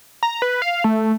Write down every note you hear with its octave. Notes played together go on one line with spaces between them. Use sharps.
A#5
B4
F5
A3